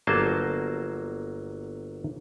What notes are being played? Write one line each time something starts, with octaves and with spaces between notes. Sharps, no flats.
G1 F#3 A#3 C5 A5